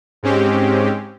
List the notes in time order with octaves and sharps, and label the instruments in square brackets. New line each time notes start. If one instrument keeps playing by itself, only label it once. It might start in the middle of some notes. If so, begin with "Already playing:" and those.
[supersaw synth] G#2 G#3 C4 C#4 G4